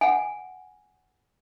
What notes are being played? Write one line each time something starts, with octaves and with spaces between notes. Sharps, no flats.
F#5 G#5